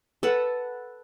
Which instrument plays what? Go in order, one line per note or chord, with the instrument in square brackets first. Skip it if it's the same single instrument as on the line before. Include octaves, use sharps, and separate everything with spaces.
[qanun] A4 B4 F#5